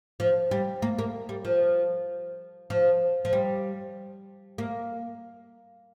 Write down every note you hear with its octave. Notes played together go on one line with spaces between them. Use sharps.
F3
G3
A#3
A#3
G3
F3
F3
F3
G3
A#3